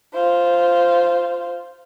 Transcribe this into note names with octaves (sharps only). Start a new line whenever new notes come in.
F4 C5